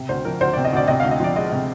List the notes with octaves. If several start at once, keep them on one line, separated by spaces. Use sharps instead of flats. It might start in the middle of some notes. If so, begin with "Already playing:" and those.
Already playing: C3
D2 C5
F3 A#4
D2 C5
D5
C3
D#5
D2 D5
C3 D#5
F5
D2
D#5
F3 D5
G#3 D#5
C3